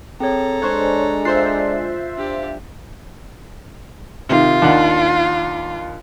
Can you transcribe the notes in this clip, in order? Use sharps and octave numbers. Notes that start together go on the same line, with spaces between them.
C4 G#4 A4 C#5 A#5
G#3 D4 C5 C#5 C#6 F#6 G#6
F4 C5 E5 F#6 A6 C7
D4 G4
C3 D#3 F4
D#2 D4 F#5